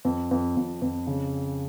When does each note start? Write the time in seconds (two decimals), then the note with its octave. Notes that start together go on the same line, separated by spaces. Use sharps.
0.05 F2
0.31 F2
0.57 F2
0.82 F2
1.07 C#3